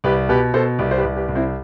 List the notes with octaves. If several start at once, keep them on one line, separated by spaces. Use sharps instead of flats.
C2 G4 B4
B2 G4 B4
B2 A4 C5
C2 G4 B4
C5
G4 B4
C2
G4 B4
C2
C4 E4